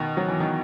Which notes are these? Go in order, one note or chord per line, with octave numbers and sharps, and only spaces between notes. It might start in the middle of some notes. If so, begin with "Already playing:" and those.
Already playing: B2 D#3
F#3
E3
D#3